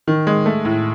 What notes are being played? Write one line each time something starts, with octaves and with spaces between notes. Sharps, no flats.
D#3
G#3
A3
A2